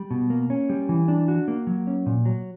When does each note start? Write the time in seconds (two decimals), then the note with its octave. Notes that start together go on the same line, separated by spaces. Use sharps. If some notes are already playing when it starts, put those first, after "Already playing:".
Already playing: G3
0.11 B2
0.30 A#3
0.50 C#4
0.69 G3
0.89 E3
1.08 D4
1.28 F#4
1.48 A#3
1.67 F#3
1.87 C#4
2.06 A#2
2.25 F#3